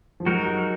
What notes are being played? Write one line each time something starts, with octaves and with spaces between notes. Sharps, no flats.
F3
F#3 G#3 D#4 F#4 A#4
F#3